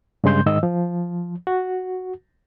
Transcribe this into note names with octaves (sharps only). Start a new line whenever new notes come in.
G2 C#3 G#3 C6 G6
G#2 D#3 D#5 E6
F3
F#4